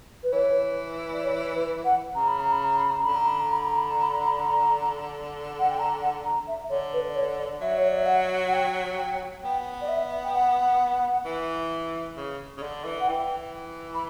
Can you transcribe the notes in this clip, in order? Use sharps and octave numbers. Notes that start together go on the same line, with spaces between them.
B4
E3 C#5
D5
C#5
B4
F#5
C#3 A#5
B5
A#5
B5
A#5
B5
A#5
D3 B5
A#5
B5
A#5
B5
A#5
B5
A#5
B5
A#5
B5
A#5
F#5
G5
A#5
F#5
A#5
E5
D3 C#5
B4
D5
C#5
D5
F#3 E5
C#5
D5
E5
F#5
F#5
G5
G5
B3 G5
D5
E5
G5
F#5
E3
C#3
C#3
D3
E3
F#5
E3 G5
B5